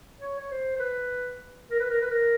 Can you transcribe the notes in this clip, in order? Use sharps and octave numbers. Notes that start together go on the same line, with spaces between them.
C#5
C#5
C5
C5
B4
A#4
B4
A#4
B4
A#4